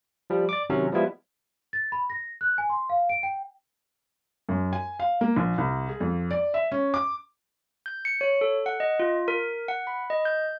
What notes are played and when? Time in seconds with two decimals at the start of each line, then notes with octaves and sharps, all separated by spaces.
0.30 F3 G3
0.49 D5 D6
0.70 C3 D#3 F#3 C#4
0.92 F3 G3 G#3 B3 E4 F4
1.73 A6
1.92 B5
2.10 A#6
2.41 F#6
2.58 G#5
2.70 C6
2.90 F5
3.09 D7
3.23 G5
4.49 F#2
4.73 G#5
5.00 F5
5.21 A#3
5.36 A#1
5.58 C2
5.89 G#4
6.00 F2
6.31 D5
6.54 E5
6.72 C#4
6.94 D6
7.86 G6
8.05 C#7
8.21 C#5
8.41 A4
8.66 F#5
8.80 D#5
9.00 F4
9.28 A#4
9.68 F#5
9.87 B5
10.10 D#5
10.25 G6